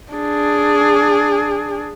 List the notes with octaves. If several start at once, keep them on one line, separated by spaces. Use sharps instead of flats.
D4 G#4